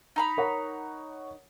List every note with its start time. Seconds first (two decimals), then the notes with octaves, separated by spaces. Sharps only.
0.16 D#4 A#5 B5
0.37 A#4 C#5 F#5